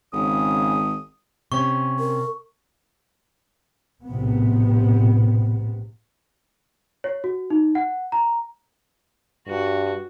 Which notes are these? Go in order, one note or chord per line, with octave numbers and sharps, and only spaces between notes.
G#1 C#3 D#6
C3 C#4 C#6
A#4
A#1 A2 C3 B3
C#5
F#4
D#4
F#5
A#5
G2 F#4